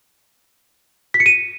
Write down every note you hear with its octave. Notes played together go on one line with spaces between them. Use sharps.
B6
C#7
D#7